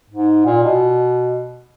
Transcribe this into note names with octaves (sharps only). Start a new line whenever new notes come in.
G#2
A#2
B2